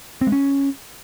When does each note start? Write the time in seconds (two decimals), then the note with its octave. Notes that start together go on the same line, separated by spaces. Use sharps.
0.21 C4
0.27 G#3
0.32 C#4